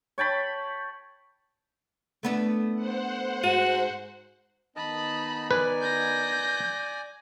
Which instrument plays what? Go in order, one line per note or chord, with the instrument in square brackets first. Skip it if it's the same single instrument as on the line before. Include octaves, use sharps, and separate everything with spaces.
[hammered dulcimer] C#5 G5 A5 B5
[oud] A3 B3 D4
[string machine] C5 F#5
[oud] G#2 [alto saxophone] F#4
[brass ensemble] D#3 B3 D#4 [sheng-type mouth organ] D#5 A5 [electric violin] B5
[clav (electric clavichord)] B4 [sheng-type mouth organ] D5 G#5
[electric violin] G6 A#6